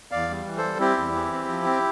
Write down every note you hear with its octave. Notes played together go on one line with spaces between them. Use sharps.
E2 D5 F5
G3
E3
A4 C5
G3
C4 E4 G4
E2
E3
C4
F3
C4